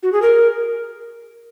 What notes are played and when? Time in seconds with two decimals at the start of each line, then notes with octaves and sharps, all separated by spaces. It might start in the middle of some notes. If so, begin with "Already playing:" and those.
0.03 F#4
0.13 G#4
0.22 A#4